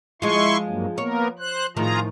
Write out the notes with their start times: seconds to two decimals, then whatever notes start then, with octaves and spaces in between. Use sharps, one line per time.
0.22 F3 G#3 E4 F4 C6 C#6
0.67 G2 F#3 A#3
0.98 A#3 B3 A#4 C#5
1.39 C5 F#6
1.77 A2 D#3 F3 F4 G#4 A#5